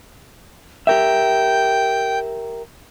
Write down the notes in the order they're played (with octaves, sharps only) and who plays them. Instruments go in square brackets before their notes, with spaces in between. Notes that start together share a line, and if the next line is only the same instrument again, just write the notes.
[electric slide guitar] G4 A#4 E5 [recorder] G5